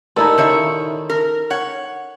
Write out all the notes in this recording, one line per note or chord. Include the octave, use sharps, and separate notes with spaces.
D#2 A#2 D#4 E4 A4
D#3 C#5 E5
A#4
C#5 F#5